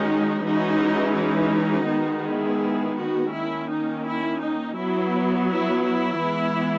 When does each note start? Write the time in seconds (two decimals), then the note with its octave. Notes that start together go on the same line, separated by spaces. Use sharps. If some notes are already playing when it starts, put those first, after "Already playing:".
Already playing: D#3 G#3 C#4 D#4 F#4
0.45 E3 G#3 C#4 D#4 F#4
1.17 D#4 F#4
1.88 D#3 G#3 B3
2.25 E4 G#4
2.96 D#4 F#4
3.33 D#3 A#3 C#4 E4
3.69 D#4
4.05 E4
4.41 D#4
4.76 F#3 B3 E4
5.49 E4
5.85 E4
6.21 E3 G#3 B3